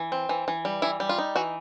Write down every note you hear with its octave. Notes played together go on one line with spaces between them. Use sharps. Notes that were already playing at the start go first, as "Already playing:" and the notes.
Already playing: E3
C4
E3
E3
G3
E3 E4
G3
F4
D#4
E3 F#4